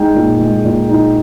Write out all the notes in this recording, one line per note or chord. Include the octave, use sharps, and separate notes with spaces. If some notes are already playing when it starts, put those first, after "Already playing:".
Already playing: G#3 D#4 G5
A#2
G#3
A#2
D#4